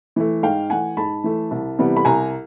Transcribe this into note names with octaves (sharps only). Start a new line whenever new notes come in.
E3 A3
G#2 F5 G5
E3 A3 F#5 G#5
G#2 A5 B5
E3 A3
C2
C3 E3 G3 B3
B5
C2 G#5 A#5